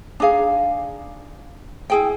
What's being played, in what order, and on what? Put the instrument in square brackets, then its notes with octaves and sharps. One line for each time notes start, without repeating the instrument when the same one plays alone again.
[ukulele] D4 D#4 G#4 F5
E4 G#4 G5